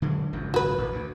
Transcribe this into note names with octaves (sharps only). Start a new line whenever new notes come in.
D3 F#3 G#3
G#1 C#2 F#2
F#4 B4
A1
D2